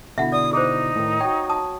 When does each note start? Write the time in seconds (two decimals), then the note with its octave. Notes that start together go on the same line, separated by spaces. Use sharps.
0.18 B2 D3 E4 E5 F#5
0.32 D5 D#6
0.53 D#4 G#4 C5
0.96 A2 D#3
1.20 F#4 C#5 G5
1.49 A5 D#6